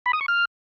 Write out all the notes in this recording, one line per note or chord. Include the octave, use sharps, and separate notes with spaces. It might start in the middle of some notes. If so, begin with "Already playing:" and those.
B5
D#6
C#6
F6